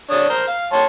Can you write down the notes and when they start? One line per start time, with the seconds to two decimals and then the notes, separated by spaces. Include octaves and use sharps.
0.11 D4 C#5 D#6
0.30 A#4 C5
0.48 F5
0.73 C#5 A5 C6